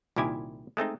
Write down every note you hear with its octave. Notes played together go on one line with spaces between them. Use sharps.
C2 A#2 D#3 E4 G4 G#5
G#3 A3 C4 D#4